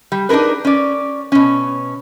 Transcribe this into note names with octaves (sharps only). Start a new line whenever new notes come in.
G3
D4 D#4 G#4 A#4 B4
C#4 D5
B2 C#4